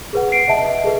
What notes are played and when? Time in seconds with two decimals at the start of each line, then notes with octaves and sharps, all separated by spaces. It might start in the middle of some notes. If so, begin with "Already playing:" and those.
0.13 G#4 B4 F#5
0.32 C7 D7
0.48 D#5 E5 A5
0.84 G#4 A4 B4